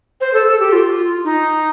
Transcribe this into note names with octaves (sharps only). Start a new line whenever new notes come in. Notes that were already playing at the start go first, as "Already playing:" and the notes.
C5
A4
A4
G4
F4
D#4